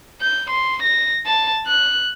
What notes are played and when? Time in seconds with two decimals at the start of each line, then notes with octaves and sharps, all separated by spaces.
0.21 G6
0.50 C6
0.83 A#6
1.26 A5
1.67 F#6